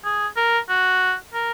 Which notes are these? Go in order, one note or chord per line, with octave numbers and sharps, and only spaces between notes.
G#4
A#4
F#4
A#4